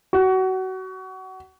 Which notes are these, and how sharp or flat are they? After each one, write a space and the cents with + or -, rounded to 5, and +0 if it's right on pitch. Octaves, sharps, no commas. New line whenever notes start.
F#4 +25